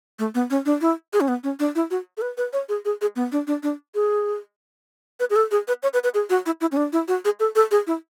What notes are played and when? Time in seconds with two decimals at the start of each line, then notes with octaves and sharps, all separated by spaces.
0.19 A3
0.35 B3
0.50 C#4
0.66 D4
0.81 E4
1.13 G#4
1.21 C#4
1.28 B3
1.44 C#4
1.59 D4
1.75 E4
1.91 F#4
2.17 A4
2.22 B4
2.38 B4
2.53 C#5
2.69 G#4
2.85 G#4
3.01 G#4
3.16 B3
3.32 D4
3.47 D4
3.63 D4
3.95 G#4
5.20 B4
5.30 G#4
5.36 A4
5.51 G#4
5.68 B4
5.83 C#5
5.94 B4
6.04 B4
6.14 G#4
6.30 F#4
6.46 E4
6.61 E4
6.72 C#4
6.77 D4
6.93 E4
7.08 F#4
7.25 G#4
7.40 A4
7.55 A4
7.71 G#4
7.87 E4